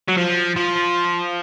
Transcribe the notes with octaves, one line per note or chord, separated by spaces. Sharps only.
F#3
F3
F3